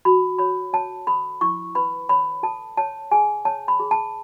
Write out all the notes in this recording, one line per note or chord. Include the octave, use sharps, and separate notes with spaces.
F#4 B5
C#5 B5
C#5 A5
A4 B5
E4 C#6
B4 B5
C#5 B5
A4 A5
C#5 A5
G#4 G#5
C#5 A5
B5
G#4
A5